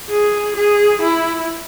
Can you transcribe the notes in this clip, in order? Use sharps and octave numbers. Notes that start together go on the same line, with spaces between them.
G#4
G#4
E4